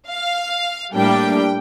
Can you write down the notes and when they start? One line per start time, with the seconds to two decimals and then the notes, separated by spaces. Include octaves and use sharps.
0.09 F5
0.94 A2 G3 A#3 D4 G5